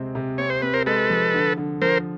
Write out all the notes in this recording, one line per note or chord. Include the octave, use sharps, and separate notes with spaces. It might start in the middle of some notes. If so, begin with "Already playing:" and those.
Already playing: C3 G#3 C4
C3
C4 C#5
C5
C4 B4
A#4 C5
G#3 A4 B4
F3
D3
D3
F3 A#4 C5